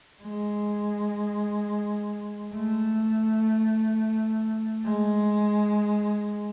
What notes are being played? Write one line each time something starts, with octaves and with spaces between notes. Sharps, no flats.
G#3
A3
G#3